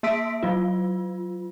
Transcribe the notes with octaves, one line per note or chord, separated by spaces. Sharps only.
A#3 E5 C6 E6 B6 D7
F#3 F4